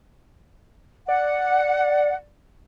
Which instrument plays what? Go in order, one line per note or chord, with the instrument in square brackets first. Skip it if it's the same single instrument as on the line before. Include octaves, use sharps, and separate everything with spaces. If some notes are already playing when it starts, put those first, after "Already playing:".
[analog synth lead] D5 [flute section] F#5